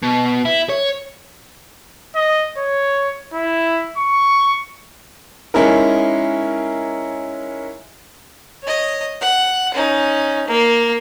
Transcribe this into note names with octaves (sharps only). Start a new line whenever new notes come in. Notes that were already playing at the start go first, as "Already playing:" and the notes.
B2
E4
C#5
D#5
C#5
E4
C#6
G#3 C#4 D#4 E4 A#4
C#5 D#5
F#5
C#4 D#4
A#3